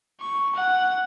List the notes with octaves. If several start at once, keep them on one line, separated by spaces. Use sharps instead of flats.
C#6
F#5